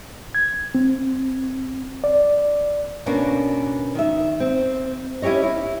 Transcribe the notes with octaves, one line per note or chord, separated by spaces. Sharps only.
G#6
C4
D5
B2 A#3 C#4 D4 F#4
D#3 E5
C4
C#4 E4 G4 C#5 D#5
E4